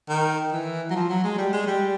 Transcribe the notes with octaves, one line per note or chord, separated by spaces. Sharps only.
D#3
E3
F#3
F3
F#3
G#3
G3
G#3
G3